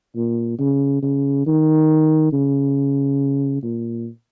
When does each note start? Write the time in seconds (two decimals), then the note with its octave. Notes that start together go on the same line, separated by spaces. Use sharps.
0.16 A#2
0.59 C#3
1.02 C#3
1.46 D#3
2.32 C#3
3.62 A#2